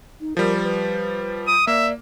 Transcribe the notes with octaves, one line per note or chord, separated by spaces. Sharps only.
D#4
F3 G3 A#4
B4
D#6
A#3 D5 E5